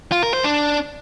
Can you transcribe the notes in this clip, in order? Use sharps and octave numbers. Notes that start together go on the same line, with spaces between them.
F4
A#4
C5
D4